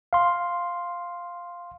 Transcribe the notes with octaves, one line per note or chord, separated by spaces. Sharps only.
F5 C6